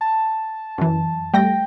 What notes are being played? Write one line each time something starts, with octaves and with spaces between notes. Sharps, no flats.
A5
F#2 E3
G3 A3 G5 A#6